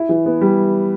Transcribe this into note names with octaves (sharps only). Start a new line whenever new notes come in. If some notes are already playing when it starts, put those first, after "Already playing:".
Already playing: E4
E3
B3
G3